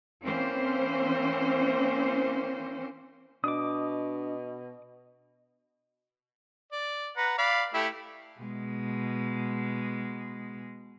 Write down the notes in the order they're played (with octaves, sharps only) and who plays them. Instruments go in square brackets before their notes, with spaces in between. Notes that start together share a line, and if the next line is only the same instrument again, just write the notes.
[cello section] E3 A#3 C4 C#4 C5
[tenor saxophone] B2 [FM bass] D4 [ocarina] D#5 [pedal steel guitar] D6 D#6
[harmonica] D5
B4 F#5 A#5
D5 F5 B5
A3 E4 G4
[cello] B2 G#3